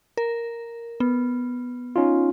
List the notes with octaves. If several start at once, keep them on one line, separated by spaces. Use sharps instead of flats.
A#4
B3
C#4 D#4 F4